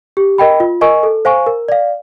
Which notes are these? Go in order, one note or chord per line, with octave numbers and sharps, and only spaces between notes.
G4
A#4 D#5 G5 B5
F4
A#4 D#5 G#5 C#6
A4
C5 F5 G#5 C#6
A#4
D5 F5